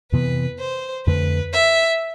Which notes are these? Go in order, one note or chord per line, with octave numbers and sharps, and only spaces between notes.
F2 C3 E3 B3 B4
C5
F2 D3 A3 B4
E5